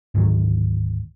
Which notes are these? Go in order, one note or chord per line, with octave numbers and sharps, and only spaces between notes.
D1 G#2 D#3 F#3